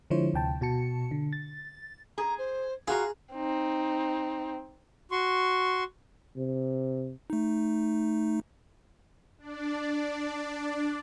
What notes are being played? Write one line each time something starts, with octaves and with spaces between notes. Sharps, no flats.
D3 F3 G#3 E4 C5 C#5
D2 C3 G5 A5
B2 F#4 A5 C#7
D3
A6
G#4 A#5
C5
F4 F#4 G#4 F5 A#5
C4 D#4
F#4 C6 C#6
C3
A3 D#4
D4 D5